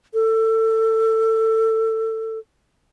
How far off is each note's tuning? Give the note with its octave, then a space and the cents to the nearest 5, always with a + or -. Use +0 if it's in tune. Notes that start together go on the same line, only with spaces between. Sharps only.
A4 +20